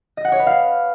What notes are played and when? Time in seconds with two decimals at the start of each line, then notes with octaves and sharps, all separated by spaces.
0.17 D#5
0.25 F#5
0.32 C#5
0.39 B4
0.47 F5